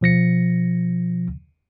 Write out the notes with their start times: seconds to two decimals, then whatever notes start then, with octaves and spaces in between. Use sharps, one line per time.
0.01 B2 F3 A#6 C#7